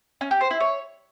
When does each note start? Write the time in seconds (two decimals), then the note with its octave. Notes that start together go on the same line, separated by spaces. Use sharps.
0.21 C#4
0.31 G4
0.41 C5
0.51 E4
0.60 C#5